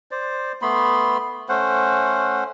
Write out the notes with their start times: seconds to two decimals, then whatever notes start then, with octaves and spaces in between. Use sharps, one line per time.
0.11 C5 D5
0.62 A3 B3 B5 C6
1.49 A3 C#4 C5 F#5